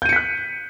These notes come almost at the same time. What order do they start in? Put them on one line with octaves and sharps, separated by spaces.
G6 D#7 C#7 B6 F#6